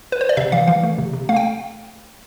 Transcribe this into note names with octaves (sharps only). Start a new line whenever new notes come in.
B4
C5
D5
C3 E5
E3 F5
E3 F5
A3
C3
C3
A3 F5
G5